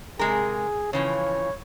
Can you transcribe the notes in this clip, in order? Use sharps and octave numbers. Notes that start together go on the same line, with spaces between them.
C3 G#3 G#4 A#4
C#3 E3 F3 C#5